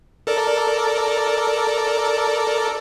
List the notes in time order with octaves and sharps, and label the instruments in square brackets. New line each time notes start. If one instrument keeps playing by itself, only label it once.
[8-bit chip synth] A4 A#4 D5